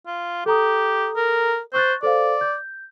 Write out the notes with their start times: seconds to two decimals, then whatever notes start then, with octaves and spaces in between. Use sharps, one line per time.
0.07 F4
0.46 G4 A4 A#5 D#6
1.16 A#4
1.74 C5 C#6 F#6 A6
2.03 A4 C5 D5 F5
2.41 G6